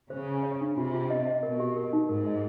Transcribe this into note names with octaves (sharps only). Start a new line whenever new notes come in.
C#3 C5
G#5
C#5
D4
C3 F4
F4
D#5
D#5
B2 A#4
G4
A#4
D#4
G#2 A#4
D#5